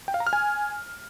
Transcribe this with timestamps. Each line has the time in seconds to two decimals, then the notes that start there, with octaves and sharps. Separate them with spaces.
0.08 G5
0.14 F5
0.20 A#5
0.27 F6
0.33 G#5